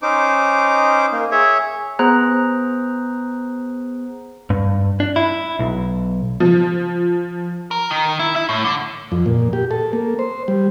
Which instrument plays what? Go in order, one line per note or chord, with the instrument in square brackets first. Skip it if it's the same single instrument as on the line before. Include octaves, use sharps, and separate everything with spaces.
[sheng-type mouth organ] C#4 D#4 C5 D6
A#3
G#4 C#5 E5
[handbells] B3 G#4 C5 A#5 F#6
[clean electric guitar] G2
D4
E4
B1
[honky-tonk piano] F3
[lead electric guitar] A#4
D#3
E4
E4
A2
D3
[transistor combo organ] F2
A#2
G4
A4
A#3
C5
G3